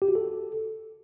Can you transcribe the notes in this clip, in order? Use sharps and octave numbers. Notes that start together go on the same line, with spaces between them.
G4
F#4
A4